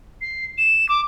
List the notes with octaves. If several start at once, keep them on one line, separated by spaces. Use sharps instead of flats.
C7
E7
D6